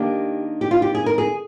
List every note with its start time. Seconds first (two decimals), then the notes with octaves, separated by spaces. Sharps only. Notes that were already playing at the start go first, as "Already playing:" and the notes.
Already playing: D#3 A#3 D4 G4
0.61 G4
0.71 F4
0.82 G4
0.95 G#4
1.06 A#4
1.18 G#4